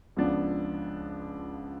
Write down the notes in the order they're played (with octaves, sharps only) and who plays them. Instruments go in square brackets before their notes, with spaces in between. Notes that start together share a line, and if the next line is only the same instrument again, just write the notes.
[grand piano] C#2 C#3 F3 B3 D4